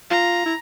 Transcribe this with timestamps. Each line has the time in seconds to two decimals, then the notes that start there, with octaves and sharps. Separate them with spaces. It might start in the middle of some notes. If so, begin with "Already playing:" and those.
0.10 F4 A#5
0.46 E4